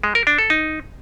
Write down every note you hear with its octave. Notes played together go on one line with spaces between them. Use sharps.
G#3
A#4
D4
A4
D#4